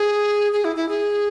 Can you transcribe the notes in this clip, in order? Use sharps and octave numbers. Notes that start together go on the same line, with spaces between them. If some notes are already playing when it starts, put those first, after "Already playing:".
Already playing: G#4
G#4
E4
E4
G#4